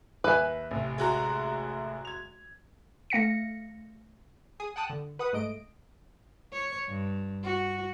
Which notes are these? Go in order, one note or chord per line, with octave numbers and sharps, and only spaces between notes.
D#2 B4 E5 G#5
A1 C3
G#3 F#4 A#5
G#6 F7
A3 F5 A#6 C#7
G#4 G#5 D#6
F#5 G5 A5 D#6 F#6
D3
B4 F#5 D#6
G#2 A3 D#5 D7
C#5
G2
F#4